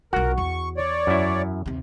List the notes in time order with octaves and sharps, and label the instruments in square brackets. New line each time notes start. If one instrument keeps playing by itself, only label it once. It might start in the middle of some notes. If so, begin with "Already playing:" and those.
[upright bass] B1 F4 [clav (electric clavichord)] F#4 F#5 [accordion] A#4
[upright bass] E2 [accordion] C#6
[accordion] C#5 D5
[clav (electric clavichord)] F#2 E4
[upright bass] D#2 C3